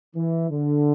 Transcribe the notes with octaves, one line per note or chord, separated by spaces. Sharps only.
E3
D3